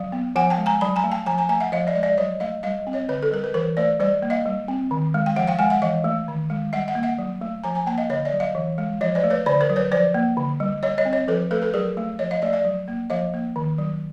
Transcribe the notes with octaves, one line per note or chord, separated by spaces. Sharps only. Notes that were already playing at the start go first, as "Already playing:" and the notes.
Already playing: F#3 F5
B3
F3 F#5 G#5
G5 A5
G#3
G#5 A#5
F#3 A5 B5
G#5 A#5
A3
G5 A5
F3 G#5 A#5
G#5 A#5
A3 G#5 A#5
E5 F#5
F3 D#5 F5
D5 E5
G#3 D#5
D5 E5
F#3 C#5 D#5
A3 D#5 F5
G3 D#5 F5
C4
C#5 D#5
D3 B4 C#5
A4
G3 A#4
B4
E3 A#4 C5
A3 C5 D5
G3 C5 D5
A#3
D#5 F5
G3
C4
D#3
G#3
G5
F3 E5 F#5
F5 G5
G#3 F#5 G#5
E5 F#5
E3 D#5 F5
A3
D#3
G#3
G3 E5 F#5
E5 F#5
A#3
E5 F#5
F#3
A3
F3 G#5 A#5
G#5 A#5
A#3 G5 A5
D#5 F5
D3 C#5 D#5
D5 E5
F#3
D#5 F5
E3
G#3
F3 C#5 D#5
C5 D5
A3
B4 C#5
D3 C5 D5
A#4 C5
F#3
B4 C#5
F3 C5 D5
A#3
D3
G3
G3 C#5 D#5
C#5 D#5
C4
C#5 D#5
F3 A4 B4
A3 A4 B4
A4 B4
F#3 G#4 A#4
A3
F3 C#5 D#5
D#5 F5
A3 D5 E5
D5 E5
F#3
A#3
F3 D#5 F5
A#3
D#3
F#3